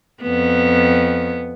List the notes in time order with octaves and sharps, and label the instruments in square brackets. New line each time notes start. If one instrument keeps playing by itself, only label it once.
[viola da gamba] F2 B3